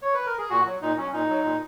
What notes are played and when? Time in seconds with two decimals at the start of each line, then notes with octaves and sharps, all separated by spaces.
0.02 C#5
0.14 B4
0.26 A#4
0.38 G#4
0.50 A#2 F#4
0.66 F#3
0.82 A#2 D#4
0.97 F#3 C#4
1.13 A#2 D#4
1.29 F#3
1.44 A#2